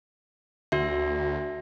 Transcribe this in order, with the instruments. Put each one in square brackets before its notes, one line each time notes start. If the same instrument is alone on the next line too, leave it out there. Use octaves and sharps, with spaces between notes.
[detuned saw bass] D2 [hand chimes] F#4 E5